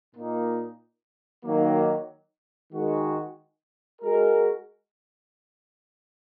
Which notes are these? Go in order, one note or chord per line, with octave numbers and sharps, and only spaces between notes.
A#2 A#3 D#4
D#3 F#3 A#3
D#3 G#3 F#4
G#3 F#4 A#4